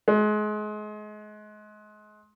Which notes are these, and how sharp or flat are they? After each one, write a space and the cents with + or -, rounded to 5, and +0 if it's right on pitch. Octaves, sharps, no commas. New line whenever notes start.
G#3 +30